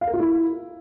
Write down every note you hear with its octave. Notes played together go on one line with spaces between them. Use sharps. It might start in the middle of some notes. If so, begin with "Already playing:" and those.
F5
A#4
F4
E4